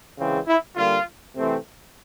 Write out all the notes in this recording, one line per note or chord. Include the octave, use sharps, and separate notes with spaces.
C#3 E3 G#3 C4
E4
D3 G3 A#3 F4
C3 E3 A3 C4